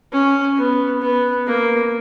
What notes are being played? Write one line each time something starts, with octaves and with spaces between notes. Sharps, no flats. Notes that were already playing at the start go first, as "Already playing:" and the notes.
C#4
B3
B3
A#3